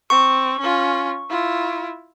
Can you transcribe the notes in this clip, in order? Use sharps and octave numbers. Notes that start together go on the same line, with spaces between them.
C4 C#6
C#4 F4
E4 F4